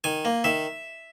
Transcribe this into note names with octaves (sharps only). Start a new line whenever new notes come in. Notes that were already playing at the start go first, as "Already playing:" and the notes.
D#3 G#5
A#3
D#3 E5